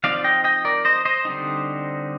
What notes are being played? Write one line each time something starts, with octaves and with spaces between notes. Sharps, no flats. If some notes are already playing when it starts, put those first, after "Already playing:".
F3 C4 D#4 D5 F5
D#5 G5
D#5 G5
A#4 D5
C5 D#5
C5 D#5
D3 G3 C4 D#4